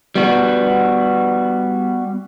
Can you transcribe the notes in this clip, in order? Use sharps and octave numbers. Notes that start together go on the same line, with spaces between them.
G3 B3 F#4